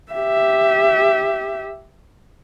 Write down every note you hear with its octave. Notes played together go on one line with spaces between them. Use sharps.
G4 E5